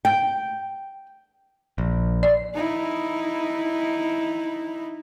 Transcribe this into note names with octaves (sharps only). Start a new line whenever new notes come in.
G5
A#1
D5
D#4 E4